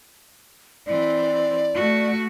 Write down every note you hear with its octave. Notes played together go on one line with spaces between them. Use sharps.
E3 C4 D5
A3 F#4